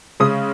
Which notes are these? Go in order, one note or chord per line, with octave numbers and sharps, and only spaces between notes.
C#3 G#3 C#4 D#6